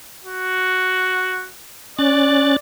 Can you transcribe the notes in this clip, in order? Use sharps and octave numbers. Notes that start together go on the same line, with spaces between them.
F#4
C#4 D5 F#6 A6